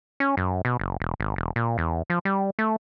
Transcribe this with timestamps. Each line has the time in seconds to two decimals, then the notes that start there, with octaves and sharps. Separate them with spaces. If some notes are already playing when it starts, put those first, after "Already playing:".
0.20 C#4
0.37 F#2
0.65 B2
0.80 F#1
1.00 E1
1.20 G#1
1.36 E1
1.56 A#2
1.78 E2
2.10 F3
2.25 G3
2.59 A3